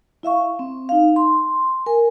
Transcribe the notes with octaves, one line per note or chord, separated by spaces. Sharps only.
E4 E5 F5 C#6
C4
D#4 F5
C6
A#4 G#5